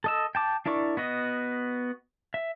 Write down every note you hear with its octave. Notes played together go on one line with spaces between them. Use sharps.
A4 D#5 E6
G5 A5 D6
D4 E4 A#4 D5 C#6
B3 F#4 D#5
E5